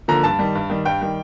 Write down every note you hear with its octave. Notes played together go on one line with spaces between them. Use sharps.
D3 F3 A#3 A#5
G2 A5
D#3 G3
G2
D#3 G3
G2 G5
D#3 G3